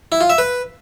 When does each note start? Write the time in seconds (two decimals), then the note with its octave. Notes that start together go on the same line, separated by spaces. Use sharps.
0.12 E4
0.21 F4
0.30 E5
0.38 B4